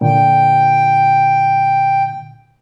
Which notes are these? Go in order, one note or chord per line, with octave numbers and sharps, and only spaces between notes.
A#2 D3 G5